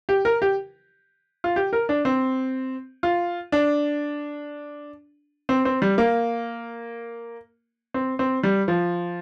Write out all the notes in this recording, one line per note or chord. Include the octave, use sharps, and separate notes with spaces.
G4
A#4
G4
F4
G4
A#4
D4
C4
F4
D4
C4
C4
G3
A#3
C4
C4
G3
F3